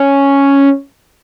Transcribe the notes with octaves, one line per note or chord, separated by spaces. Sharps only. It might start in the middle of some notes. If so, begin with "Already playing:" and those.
Already playing: C#4